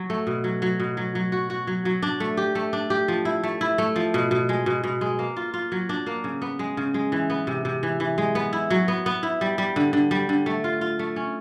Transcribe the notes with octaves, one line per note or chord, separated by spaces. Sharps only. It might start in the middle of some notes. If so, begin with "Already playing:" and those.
Already playing: F#3
A3
B2
F#3
F#3
B2
F#3
F#3
F#4
F#4
F#3
F#3
D4
A3
G4
A3
D4
G4
F3
E4
A3
E4
A3
F3
B2
B2
G#3
B2
B2
G#3
A#3
F4
F4
F#3
D4
A#3
C#3
B3
G#3
C#3
G#3
E3
B3
C3
C3
E3
E3
G#3
B3
E4
F#3
B3
B3
E4
G3
G3
D3
D3
G3
D3
A3
F4
F4
A3
C#4